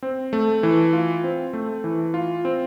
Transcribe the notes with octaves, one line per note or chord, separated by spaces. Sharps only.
C4
A3
E3
F4
C4
A3
E3
F4
C4